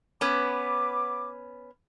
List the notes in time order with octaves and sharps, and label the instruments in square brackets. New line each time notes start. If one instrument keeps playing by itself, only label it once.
[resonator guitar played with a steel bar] B3 C#4 B4 [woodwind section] F#5 B5 D6